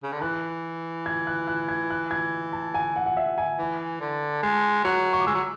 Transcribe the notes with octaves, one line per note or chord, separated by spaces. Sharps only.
C#3
D3
E3 F#6
G#6
F#6
F#6
G#6
F#6
G#6
A5
G#5
F#5
F#5
E5
G#5
E3
D3
G#3 A5
F#3 F#6
C#6
D6
G#3 E6
F#3